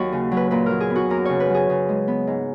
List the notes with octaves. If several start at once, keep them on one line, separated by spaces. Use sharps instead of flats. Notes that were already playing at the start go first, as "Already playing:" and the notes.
Already playing: D#2 F#3 A#3 F#4
C#3
F#3
B4
A#2 B4
F#3 A#4
G#4
B3
F#4
F#2 A#4
C#3 C#5
B4
F#3 G#4
C#3
G#3
B3
G#2